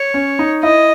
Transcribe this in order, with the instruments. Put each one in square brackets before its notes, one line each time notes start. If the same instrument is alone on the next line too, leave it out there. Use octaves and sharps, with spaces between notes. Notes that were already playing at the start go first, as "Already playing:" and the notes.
Already playing: [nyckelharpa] C#5
[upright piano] C#4
D#4
[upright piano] E4 [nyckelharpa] D#5